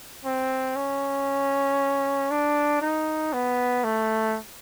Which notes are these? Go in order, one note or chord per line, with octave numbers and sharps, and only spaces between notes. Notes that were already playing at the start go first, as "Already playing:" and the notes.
C4
C#4
D4
D#4
B3
A3